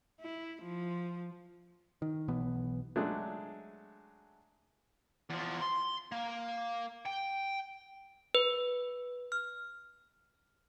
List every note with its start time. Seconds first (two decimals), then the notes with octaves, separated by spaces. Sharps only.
0.21 E4
0.62 F3
2.02 D#3
2.28 B1 B2 E3 B3
2.96 F#3 G#3 A3 D4
5.30 E2 F3
5.62 C6
6.12 A#3
7.05 G5
8.35 B4
9.32 F6